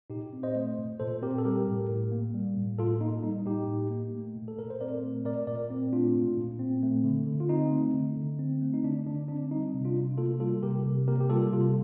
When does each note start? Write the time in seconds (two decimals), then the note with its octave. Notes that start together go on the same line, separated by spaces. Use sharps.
0.10 A#2 D#4 G4
0.33 C4
0.43 C5 D#5
0.55 A3
0.78 A#2
1.00 A#2 A4 C5
1.22 C4 G4 A#4
1.38 A4
1.45 G3 G4 A#4
1.68 A2
1.89 A2
2.11 A#3
2.35 G3
2.57 A2
2.78 A2 F4 A4
3.01 A#3 D#4
3.23 G3 D#4
3.46 A2 D#4 G4
3.68 A2
3.91 A#3
4.14 A3
4.36 A#2
4.48 A4
4.58 A#2 A#4
4.70 C5
4.81 C4 A#4 D5
5.03 A3
5.25 A#2 A#4 D5
5.47 A#2 A#4 D5
5.70 C4
5.93 A3 D4 F4
6.15 A#2
6.37 A#2
6.59 C4
6.83 A3
7.04 D3
7.27 D3
7.40 F4
7.49 C4 D#4
7.72 A3
7.94 D3
8.17 D3
8.39 C4
8.61 A3
8.73 D#4
8.83 D3 D4
9.07 D3 D4
9.28 C4 D4
9.51 G3 D#4
9.74 C3
9.85 D4 F4
9.96 C3
10.18 A#3 F4 A4
10.40 G3 F4 A4
10.63 C3 G4 A#4
10.85 C3
11.08 A#3 G4 A#4
11.21 G4
11.30 G3 F4 A4
11.53 C3 F4 A4